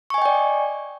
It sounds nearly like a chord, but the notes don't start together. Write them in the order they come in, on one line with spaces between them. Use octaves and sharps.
C#6 G#5 D#5 G5 D5